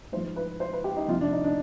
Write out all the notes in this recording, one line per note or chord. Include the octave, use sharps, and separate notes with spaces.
G#2 F3 C5
B4
C5
B4
G4
D#4
F2 C3 F3 F4
D4
D#4
D4